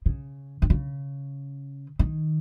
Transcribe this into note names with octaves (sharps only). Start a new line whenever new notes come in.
C#3
D#3
C#3
D#3